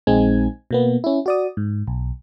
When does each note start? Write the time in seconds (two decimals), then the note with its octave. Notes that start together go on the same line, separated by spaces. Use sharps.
0.07 A#1 G#3 C4 D#4 G#5 G#6
0.71 B2 A#3 B3
1.04 C#4 E4
1.26 F#4 D5 D#6
1.57 G#2
1.87 B1